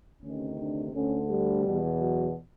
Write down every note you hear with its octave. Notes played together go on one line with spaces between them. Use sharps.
D2 C3 D#3 C#4
D4
D2 D3 C#4
G3
E2 B2
F#3